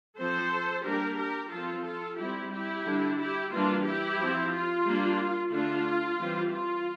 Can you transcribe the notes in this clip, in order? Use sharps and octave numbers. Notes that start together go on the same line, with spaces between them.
F3 C4 A4 C5
G3 A#3 D4 G4 A#4
G4 A#4
F3 C4 F4 A4
F4 A4
G3 C4 E4 G4
E4 G4
D3 G3 D4
E4 G4
E3 G3 A#3 D4 F4
E4 G4
F3 C4
F4
G3 A#3 D4
D3 A3 D4 F4
E3 G3 C4
F4